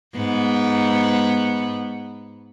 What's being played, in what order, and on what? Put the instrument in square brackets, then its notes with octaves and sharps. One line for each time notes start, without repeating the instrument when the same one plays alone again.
[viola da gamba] G#2 B3